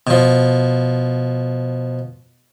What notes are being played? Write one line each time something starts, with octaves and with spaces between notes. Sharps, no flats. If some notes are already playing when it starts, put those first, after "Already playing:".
B2 F3